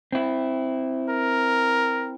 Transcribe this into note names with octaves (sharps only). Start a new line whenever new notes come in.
C4 E4
A#4